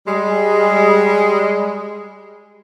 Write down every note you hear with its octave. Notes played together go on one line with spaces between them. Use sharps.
G3 G#3